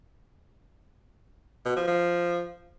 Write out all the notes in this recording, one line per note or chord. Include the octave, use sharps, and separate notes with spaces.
B2
F3
F3